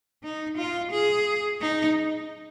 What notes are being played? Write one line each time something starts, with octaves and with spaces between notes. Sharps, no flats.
D#4
F4
G#4
D#4